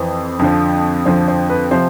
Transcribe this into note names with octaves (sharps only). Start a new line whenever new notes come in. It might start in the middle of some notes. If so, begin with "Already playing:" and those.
Already playing: F2 E3 C5
F2 D3 F3
F2 D3 F3 C5
C5
B4
C3 F3 C5